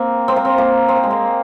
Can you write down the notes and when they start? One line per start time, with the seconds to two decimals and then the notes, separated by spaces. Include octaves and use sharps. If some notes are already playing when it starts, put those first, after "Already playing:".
Already playing: A#3 C4
0.28 C4
0.36 A#3
0.45 C4
0.58 A#3
0.88 C4
0.96 A#3
1.03 G#3
1.11 A#3